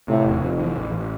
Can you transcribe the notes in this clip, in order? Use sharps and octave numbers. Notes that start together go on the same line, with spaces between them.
A2 C3
E1
F1 F2
E3
A1
A1